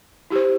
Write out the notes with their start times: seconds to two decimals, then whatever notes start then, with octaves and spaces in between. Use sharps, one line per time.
0.30 E4 G4 C5